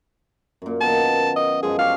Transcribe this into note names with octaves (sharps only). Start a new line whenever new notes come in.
F#2 A#2
D#3 B3 A5
D#5
F#2 F3 G#3 G#4
D4 G4 F5 C#6